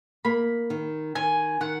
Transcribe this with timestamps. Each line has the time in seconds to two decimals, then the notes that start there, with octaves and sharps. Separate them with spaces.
0.25 A#3 B5
0.70 D#3
1.15 D#3 G#5
1.61 D#3 F#5